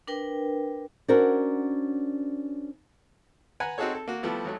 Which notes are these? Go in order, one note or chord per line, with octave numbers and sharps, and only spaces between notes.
D4 A#4 B4 G5
C#4 D4 F#4 A#4 C5 D5
B4 F#5 G#5 A#5 B5
C4 D#4 F#4 G#4 A4 C#5
A4
A#3 F#4
F3 G3 A3 B3 E4
G#1 F#3 A3